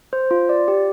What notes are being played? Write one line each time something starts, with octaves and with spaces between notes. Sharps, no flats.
C5
F4
D5
G4